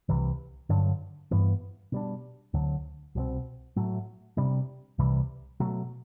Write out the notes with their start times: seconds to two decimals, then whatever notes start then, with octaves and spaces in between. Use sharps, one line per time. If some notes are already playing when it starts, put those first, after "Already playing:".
0.09 C2 C3 E3
0.69 G2 D3 F#3
1.31 G2 E3 B3
1.92 B2 G3 D4
2.53 D2 D3 F#3
3.15 C2 B2 G3 C4
3.76 A2 F#3 A3
4.37 C3 G3 D4
4.98 C2 C3 E3 G3
5.60 B2 F#3 A3